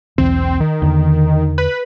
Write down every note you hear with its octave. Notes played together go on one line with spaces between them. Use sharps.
B1 E2 C4
D#3
E2 D3
B4